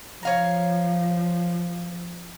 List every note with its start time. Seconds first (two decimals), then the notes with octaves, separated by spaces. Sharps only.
0.23 F3 C#5 F5 A#5